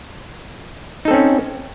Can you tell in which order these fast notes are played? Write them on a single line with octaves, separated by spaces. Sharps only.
D#4 A4 C4 C#4